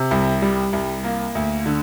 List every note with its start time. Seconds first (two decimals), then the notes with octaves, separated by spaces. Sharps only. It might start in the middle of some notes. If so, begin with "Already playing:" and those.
Already playing: C3
0.11 C2
0.42 G3
0.73 C2
1.04 A#3
1.35 D2
1.66 D3